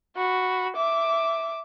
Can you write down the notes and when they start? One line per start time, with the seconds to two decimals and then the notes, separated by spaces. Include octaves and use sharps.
0.17 F#4 B5
0.76 E5 D6